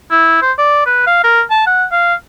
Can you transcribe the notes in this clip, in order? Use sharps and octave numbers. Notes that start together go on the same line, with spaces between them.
E4
C5
D5
B4
F5
A#4
A5
F#5
F5